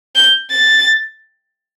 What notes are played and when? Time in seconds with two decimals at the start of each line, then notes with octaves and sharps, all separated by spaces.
0.15 G6
0.51 A6